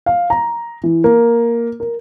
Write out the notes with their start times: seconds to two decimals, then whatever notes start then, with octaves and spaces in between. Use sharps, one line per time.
0.06 F5
0.30 A#5
0.84 E3
1.04 A#3
1.80 A#4